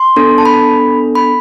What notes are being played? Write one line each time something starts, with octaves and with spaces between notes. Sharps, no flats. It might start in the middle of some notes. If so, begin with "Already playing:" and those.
Already playing: C6
B3 D4 A4
A5
B5
B5